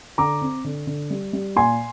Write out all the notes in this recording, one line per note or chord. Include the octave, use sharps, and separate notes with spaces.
D3 A#5 D6
C4
D3
D3
G3
G3
A#2 G#5 C6